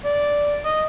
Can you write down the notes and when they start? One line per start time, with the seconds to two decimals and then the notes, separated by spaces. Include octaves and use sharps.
0.05 D5
0.65 D#5